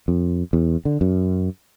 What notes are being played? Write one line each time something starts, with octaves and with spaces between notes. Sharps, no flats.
F2
E2
D3
F#2